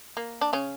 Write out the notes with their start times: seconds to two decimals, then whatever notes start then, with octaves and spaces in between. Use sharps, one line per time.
0.17 A#3
0.41 D4
0.53 C#3 C#4